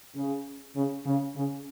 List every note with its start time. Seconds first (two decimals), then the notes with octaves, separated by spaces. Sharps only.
0.14 C#3
0.75 C#3
1.05 C#3
1.35 C#3